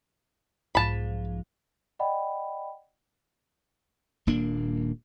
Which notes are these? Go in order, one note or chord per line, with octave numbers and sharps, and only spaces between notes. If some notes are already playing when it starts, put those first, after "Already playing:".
B1 G#2 F3 A5 B5
D5 D#5 F#5 G5 B5
D#1 A#2 A#3 D4